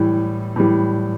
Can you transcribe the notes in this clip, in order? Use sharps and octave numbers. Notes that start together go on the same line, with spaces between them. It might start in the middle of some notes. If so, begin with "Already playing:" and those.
Already playing: A2 E3 G3
A2 E3 G3